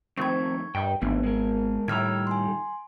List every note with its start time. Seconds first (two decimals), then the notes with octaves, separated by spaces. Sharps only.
0.17 F2 D#3 A3 C4 C#6 G#6
0.75 G2 D#5 G5
1.02 G#1 E3 A3 B3 D4
1.23 G#3 A#4
1.88 A2 D#3 G3 A#5 E6 F6 G#6
2.27 G#5 C6